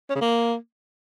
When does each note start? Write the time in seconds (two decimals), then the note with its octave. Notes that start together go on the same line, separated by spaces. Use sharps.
0.10 C#4
0.15 C#3
0.21 A#3